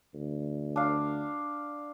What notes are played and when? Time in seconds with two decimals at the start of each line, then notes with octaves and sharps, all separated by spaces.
0.14 D2
0.76 D4 F5